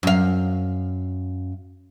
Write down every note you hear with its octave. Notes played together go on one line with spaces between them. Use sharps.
F#2 F5